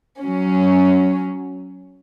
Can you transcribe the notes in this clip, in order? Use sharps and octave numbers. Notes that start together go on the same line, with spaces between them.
F#3 C#4